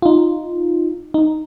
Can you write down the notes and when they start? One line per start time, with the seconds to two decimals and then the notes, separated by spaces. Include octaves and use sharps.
0.02 D#4 F4
1.14 D#4